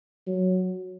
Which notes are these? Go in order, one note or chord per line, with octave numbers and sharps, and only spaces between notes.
F#3